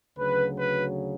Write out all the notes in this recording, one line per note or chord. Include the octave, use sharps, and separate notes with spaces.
D2 C#3 F#3 B4
B4